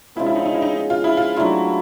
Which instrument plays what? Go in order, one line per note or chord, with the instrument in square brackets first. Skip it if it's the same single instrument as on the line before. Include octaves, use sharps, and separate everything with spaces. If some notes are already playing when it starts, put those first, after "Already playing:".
[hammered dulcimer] C#3 F3 G#3 B3 [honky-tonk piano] E4
[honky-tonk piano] E4
D#4
D#4
E4
D#4
F4
E4
F4
[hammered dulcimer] F#3 A3 D4 F4 [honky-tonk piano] E4